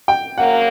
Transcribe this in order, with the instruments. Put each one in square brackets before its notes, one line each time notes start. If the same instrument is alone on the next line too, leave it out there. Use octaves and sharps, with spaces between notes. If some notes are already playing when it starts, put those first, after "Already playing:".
[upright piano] G5
[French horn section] F#2 C#3 F#3 A#3 [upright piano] F#5